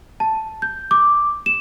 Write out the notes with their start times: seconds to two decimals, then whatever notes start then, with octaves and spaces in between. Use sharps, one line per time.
0.20 A5
0.62 G6
0.91 D6
1.46 E7